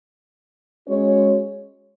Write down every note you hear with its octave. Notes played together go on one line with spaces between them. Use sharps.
G#3 C#4 F#4 C#5